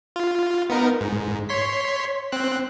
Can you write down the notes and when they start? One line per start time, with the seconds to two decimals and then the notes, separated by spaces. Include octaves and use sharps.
0.16 F4
0.70 B3 D#4 A#4
1.01 G#2
1.49 C#5 C6 B6
2.32 C4 F#6